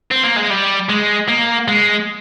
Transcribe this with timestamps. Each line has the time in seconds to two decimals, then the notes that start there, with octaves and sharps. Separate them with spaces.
0.11 C4
0.23 A#3
0.36 G#3
0.50 G3
0.89 G#3
1.29 A#3
1.68 G#3